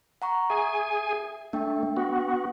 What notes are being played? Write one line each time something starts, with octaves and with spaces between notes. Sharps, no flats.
F#5 A#5 C#6
G#4 E5 G#5
A3 D4 G5
B3 F#4